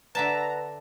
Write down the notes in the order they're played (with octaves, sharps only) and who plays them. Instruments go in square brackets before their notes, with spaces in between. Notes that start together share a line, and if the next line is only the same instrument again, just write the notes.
[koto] D3 E5 A5 [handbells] B4 D5 F#5 [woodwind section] A#5